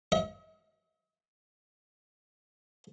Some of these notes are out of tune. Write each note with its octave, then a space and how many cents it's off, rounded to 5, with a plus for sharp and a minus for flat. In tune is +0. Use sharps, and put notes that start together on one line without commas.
D#5 +45